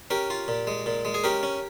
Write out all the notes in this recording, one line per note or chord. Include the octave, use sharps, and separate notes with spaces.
C#4 G4 A#4
F4
A#2
G#3
A#2
G#3
G#4
C#4 G4 A#4
C#4